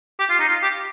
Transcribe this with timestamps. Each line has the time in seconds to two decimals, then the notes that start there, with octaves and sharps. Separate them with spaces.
0.20 G4
0.30 F4
0.40 D#4
0.49 F4
0.63 G4